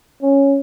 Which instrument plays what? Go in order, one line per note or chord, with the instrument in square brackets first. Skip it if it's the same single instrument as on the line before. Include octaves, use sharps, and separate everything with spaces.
[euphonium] C#4